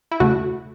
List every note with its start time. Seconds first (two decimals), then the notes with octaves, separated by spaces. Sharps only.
0.11 E4
0.20 E2 C#3 A3 F#4